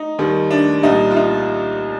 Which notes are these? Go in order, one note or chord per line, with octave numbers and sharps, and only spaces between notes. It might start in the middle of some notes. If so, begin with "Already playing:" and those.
Already playing: D#4
D#2 D#3 G3
D4
C2 A#2 G3 D#4
F4
D#4